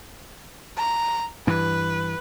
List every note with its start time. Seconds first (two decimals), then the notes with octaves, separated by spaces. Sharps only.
0.77 A#5
1.47 G2 E3 B4